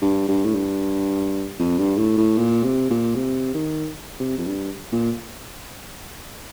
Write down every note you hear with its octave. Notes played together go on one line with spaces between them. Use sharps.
G2
G2
A2
G2
F2
G2
A2
A2
A#2
C3
A#2
C3
D#3
C3
F2
G2
A#2